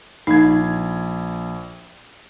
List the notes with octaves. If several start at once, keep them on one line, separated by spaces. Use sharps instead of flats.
A#1 D#4 G#6